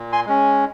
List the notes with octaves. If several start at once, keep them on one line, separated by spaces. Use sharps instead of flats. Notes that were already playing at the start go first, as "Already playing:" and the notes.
Already playing: A#2
G#5 C6
G#3 C#4